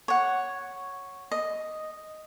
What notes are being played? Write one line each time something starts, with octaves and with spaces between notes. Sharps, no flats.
C#5 F#5
D#5